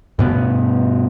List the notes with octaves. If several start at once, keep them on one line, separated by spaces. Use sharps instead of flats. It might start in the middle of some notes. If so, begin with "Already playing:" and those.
G2 B2 B3